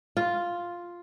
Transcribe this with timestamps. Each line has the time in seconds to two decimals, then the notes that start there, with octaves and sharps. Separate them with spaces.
0.17 F4